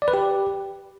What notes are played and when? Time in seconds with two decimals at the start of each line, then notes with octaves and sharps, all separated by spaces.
0.02 D5
0.08 B4
0.14 G4